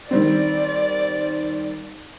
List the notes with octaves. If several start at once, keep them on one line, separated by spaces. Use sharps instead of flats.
D#3 G3 C4 D5